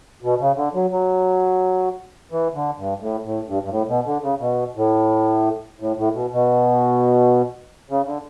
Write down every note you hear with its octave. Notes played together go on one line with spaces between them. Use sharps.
B2
C#3
D3
F#3
F#3
E3
D3
G2
A2
A2
G2
G2
A2
B2
D3
C#3
B2
A2
A2
A2
B2
B2
C#3
D3